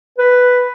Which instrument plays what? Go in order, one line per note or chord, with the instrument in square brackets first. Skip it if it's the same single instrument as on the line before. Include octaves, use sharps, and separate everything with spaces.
[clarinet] B4